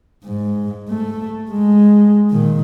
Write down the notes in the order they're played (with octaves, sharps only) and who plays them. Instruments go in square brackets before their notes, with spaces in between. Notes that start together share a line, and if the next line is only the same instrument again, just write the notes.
[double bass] G#2
A3
G#3
A#2 D#3